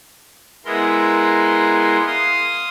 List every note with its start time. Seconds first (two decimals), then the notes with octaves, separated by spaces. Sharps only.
0.65 G#3 B3 E4 A#4 C6
2.07 F5 C6 D#6